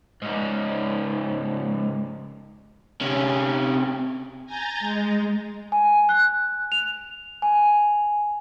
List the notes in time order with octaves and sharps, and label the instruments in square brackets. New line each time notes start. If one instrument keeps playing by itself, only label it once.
[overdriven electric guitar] C#2 G#2
C3 C#4
[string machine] G#5 A#5 G6 A6
G#3
[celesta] G#5
F#6
F7
G#5